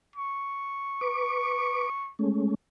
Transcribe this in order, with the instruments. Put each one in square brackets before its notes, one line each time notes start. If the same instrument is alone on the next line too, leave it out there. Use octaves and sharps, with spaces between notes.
[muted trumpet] C#6
[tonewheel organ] B4 D6
G#3 A3 C#4